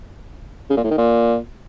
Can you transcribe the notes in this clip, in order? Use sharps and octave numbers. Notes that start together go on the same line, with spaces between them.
C#3
A#2
A2
D#3
A#2